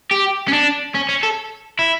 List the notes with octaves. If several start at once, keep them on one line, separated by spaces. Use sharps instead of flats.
G4
C#4
D4
C#4
C#4
A4
E4